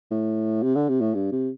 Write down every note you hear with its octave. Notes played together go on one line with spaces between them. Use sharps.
A2
C3
D3
C3
A2
G2
C3